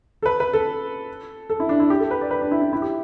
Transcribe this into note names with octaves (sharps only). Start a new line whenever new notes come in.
A4
B4
B4
A4
A4
E4
D4
E4
G4
A4
B4
D5
B4
D4
E4
E4
E4
G4